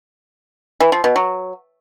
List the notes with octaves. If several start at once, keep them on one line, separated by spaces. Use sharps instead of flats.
E3
F3
B2
F#3